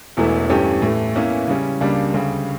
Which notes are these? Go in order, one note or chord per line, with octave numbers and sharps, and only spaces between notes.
E1 E2 E3 A3 E4
G2 E3 A3 C#4 G4
A2 E3 A3
E2 E3 A#3 C#4 E4
C#3 G3 C#4
C#2 C#3 G3 A#3 D4
D2 C#3 G3